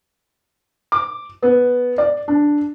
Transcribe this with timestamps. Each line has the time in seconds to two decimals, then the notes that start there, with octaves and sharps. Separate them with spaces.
0.92 D6
1.43 B3
1.98 D5
2.28 D4